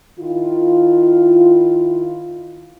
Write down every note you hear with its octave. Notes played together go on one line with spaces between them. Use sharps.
D#3 E4 F4